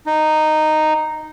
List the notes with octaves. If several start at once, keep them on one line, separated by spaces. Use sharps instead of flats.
D#4